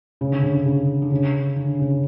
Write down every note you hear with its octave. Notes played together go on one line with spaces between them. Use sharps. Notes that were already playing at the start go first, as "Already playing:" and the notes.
C#3
D3
C#3
D3
C#3
D3
C#3
D3
C#3